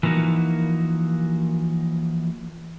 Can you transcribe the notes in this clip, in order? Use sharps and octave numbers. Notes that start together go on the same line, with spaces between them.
E3 F3 A#3 D#4 F#4